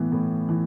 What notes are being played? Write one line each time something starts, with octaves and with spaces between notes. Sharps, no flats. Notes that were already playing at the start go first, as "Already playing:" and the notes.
Already playing: A2 E3 B3
A2
E3